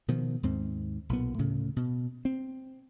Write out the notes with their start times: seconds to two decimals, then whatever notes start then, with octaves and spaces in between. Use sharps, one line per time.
0.08 B2 D#3 F3
0.43 D#2 G#2 C4
1.09 B1 A#2 B3
1.38 D2 A2 C#3
1.76 B2
2.25 C4